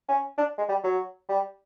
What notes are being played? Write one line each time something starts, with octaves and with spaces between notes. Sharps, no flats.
C#4
D4
G#3
G3
F#3
G3